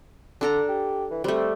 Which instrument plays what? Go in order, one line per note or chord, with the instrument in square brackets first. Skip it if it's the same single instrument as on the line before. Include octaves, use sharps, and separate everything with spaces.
[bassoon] D3 [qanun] D4 A4 A#5
[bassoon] G4
E3
[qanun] G3 A3 [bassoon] C4